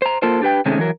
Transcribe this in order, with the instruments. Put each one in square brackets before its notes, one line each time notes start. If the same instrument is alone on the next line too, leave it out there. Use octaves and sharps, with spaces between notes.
[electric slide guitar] C5 A#5
A#3 F4 A4 A#4 C5
D4 G4 B4 G5
C3 D#3 G#3 A3 C4 C#4
E3 F#3 A#4